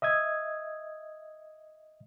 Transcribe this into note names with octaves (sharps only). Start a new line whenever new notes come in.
D#5 E5 D#6 G#6